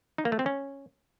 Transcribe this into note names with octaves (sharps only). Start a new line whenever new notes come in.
D#4
A#3
A3
C4
C#4